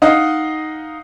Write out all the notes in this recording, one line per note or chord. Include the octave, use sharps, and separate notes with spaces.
D#4 D#5 F5 F#5